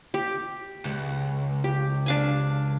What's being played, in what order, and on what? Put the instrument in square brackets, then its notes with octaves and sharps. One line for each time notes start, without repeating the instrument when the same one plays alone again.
[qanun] G4
[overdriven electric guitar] C#2
[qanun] G4
D4 F5 G#5